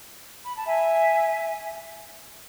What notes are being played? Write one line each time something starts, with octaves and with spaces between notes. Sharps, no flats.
B5
A5
E5 G#5